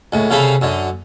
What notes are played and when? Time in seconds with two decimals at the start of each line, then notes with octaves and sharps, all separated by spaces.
0.12 C#2 A2
0.30 C2 C#3 C4 A4 F5 B5
0.61 F#2 D3